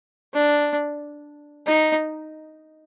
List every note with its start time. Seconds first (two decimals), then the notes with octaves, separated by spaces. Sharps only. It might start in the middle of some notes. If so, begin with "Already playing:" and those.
0.33 D4
1.67 D#4